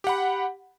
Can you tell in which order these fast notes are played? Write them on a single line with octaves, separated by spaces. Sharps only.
G4 F#5 B5